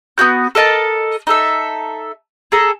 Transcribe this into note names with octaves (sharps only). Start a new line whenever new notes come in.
B3 D#4 F#4 G6
A4 A#4 D#5 A5
D#4 A4 E5
G#4 A4 A#5